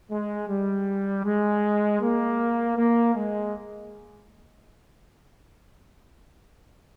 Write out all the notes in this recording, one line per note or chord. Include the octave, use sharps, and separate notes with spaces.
G#3
G3
G#3
A#3
A#3
G#3